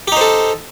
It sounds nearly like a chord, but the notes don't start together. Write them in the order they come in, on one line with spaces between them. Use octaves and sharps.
G4 D#4 C5 A4